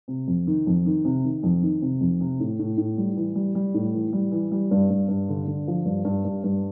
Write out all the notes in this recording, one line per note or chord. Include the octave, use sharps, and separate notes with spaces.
C3
F2
D#3
F2
D#3
C3
D#3
F2
D#3
C3
F2
C3
A2
A2
A2
G3
E3
G3
G3
A2
E3
G3
E3
G3
G2
G2
G2
D3
D3
F3
G2
G2
G2
G2